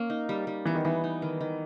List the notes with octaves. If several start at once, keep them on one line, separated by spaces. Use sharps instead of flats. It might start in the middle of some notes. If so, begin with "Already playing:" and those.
Already playing: A#3 C#4
D#4
G3
G3
E3 B3
D#3
E3 D#4
D#4
D#3
D#3